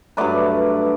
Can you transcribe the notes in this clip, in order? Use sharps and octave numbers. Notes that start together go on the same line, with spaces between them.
G2 F#3 A3 B4 D5